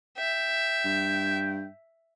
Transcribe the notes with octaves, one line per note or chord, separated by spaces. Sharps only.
E5 G5
G2